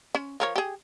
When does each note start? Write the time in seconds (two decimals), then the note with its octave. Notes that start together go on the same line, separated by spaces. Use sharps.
0.15 C#4
0.40 F3 A#4 C#5
0.56 G4 G#4